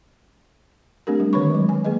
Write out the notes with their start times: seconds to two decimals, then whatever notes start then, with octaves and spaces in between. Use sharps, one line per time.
1.07 A3 C4 D4 G4 A#4
1.20 G3
1.33 D3 D#3 B4 C#5 B5 C#6
1.50 F#3 G#3
1.69 G#5
1.85 A#3 G#4 B4 D#5